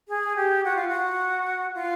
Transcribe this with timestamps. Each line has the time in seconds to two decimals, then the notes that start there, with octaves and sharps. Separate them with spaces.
0.08 G#4
0.36 G4
0.64 F#4
0.76 F4
0.88 F#4
1.75 F4